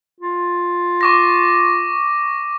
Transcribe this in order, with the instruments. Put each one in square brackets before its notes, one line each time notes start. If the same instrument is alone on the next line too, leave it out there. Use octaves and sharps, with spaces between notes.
[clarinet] F4
[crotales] C#6 D6 A#6